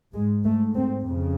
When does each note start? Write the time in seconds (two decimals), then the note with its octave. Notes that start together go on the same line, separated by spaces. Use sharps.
0.14 G#2 G#3
0.44 A3
0.75 C4
1.04 F2 C#3